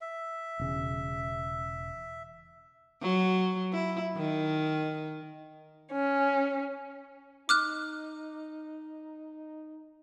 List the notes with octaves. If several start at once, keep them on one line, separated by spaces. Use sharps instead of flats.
E5
E1 C#3
F#3
E4
D#3
C#4
D#4 D6 F6 F#6